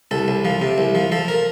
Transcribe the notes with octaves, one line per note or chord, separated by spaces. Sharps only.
C2 A4
C2
F3
C3
C2
F3
F3 A4
A#4